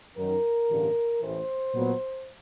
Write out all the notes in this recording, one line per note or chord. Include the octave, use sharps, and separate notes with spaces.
F#2 D#3 F#3 A#4
A1 G2 D3
A1 A2 E3 C5
A#2 F#3 B3